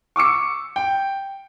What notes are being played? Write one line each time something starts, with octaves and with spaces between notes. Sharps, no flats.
C#6 D6 E6 C#7
G5